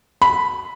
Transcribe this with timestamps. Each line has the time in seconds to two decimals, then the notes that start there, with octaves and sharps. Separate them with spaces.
0.22 B5